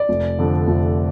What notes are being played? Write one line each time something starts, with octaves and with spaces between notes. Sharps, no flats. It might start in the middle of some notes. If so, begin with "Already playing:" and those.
Already playing: D5
F1
F2 D3
F1